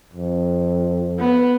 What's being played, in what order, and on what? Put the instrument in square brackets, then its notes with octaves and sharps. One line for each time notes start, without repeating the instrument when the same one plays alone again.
[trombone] F2
[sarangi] B3